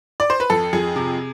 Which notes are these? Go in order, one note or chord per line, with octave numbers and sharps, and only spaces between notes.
D5
C5
B4
F2 A4
F2 G#4
C3